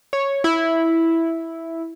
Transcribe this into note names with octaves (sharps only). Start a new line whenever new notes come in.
C#5
E4